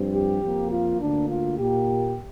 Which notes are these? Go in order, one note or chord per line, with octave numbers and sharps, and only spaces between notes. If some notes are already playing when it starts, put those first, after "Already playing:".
Already playing: G2 F3 C4
G4
F2 F3 A#3
F4
D2 D3 A#3 D4
F4
A#2 A#3 G4